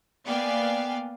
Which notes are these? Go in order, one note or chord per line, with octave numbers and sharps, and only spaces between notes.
A#3 B3 D5 F5 G5 G#5